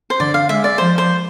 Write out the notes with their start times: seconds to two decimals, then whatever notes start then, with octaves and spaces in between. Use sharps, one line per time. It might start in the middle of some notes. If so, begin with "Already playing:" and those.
0.10 C5
0.20 D3 D5
0.34 F5
0.49 G#3 E5
0.64 D5
0.78 F3 C5
0.98 C5